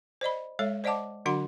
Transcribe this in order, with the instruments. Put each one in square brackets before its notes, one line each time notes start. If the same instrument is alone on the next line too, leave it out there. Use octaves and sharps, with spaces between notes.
[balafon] C5 D5 D#5 B5
G#3 A4 C#5 E5
C5 D5 D#5 F#5 A5 D6
D3 F#3 D4 F#4 F#5 C6